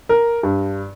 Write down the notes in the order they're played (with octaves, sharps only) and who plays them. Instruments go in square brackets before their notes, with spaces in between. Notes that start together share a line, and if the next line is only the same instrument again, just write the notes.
[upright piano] A#4
G2